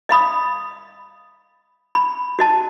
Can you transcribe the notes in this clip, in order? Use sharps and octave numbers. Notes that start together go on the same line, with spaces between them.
D#5 F5 B5 D#6
B5
F#4 D#5 A5